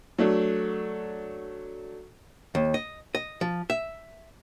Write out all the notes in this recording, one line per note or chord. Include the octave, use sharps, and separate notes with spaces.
F#3 A3 D4
D#2
D#5
D#5
F3
E5